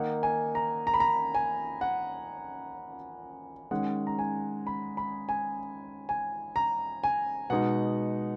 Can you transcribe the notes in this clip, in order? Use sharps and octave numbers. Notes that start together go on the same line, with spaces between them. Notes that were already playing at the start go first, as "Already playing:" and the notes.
Already playing: D#3 A#3 D#4 F#5
G#5
A#5
A#5
B5
A#5
G#5
F#5
D#3 G#3 C#4 F#5
A#5
G#5
B5
B5
G#5
G#5
A#5
G#5
B2 G#3 D#4 F#5